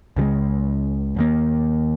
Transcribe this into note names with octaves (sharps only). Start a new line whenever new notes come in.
C#2 C#3 F3 G#3
D#2 D#3 A#3